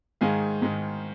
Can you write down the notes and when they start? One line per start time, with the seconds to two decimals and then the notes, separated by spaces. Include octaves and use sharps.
0.21 G#2 D#3 G#3 F5 G#5
0.62 G#2 D#3 G#3